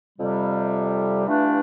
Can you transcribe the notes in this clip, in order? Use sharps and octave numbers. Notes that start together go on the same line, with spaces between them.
F2 C3 G3
G2 E3 A3 D4 F4